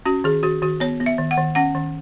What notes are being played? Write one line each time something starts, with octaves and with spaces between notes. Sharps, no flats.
C#4 F#4
D#3 G#4
D#3 F#4
D#3 F#4
B3 C#5
B3
E5
D#3
F#5
D#3
C#4 F#5
D#3